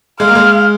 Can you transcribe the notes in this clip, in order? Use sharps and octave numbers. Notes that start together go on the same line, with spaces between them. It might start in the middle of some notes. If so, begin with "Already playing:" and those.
G#3 F5
A#3
G#3